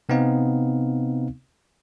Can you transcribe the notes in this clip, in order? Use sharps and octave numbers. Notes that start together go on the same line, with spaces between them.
C3 B3 C4 D#4 F5